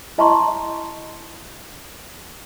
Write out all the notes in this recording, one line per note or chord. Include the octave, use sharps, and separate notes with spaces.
E4 D#5 A5 A#5 C6 C#6